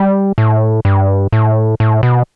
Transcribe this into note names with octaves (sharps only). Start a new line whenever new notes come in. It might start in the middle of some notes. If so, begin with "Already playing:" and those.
Already playing: G3
A2
G2
A2
A2
B2